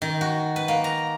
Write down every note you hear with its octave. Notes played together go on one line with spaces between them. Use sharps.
D#3
F#4
B4
A#3
A#5